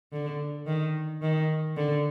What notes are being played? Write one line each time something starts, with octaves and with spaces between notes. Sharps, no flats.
D3
D#3
D#3
D3